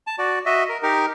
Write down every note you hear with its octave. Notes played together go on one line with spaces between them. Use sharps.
A5
F#4 D5
F#4 D#5 E5
A#4
D#4 G4 A#4